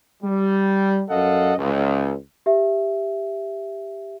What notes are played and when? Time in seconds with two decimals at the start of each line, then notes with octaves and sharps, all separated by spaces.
0.23 G3
1.09 F#2 A4 D#5 F5 F#5
1.58 C#2
2.46 G4 E5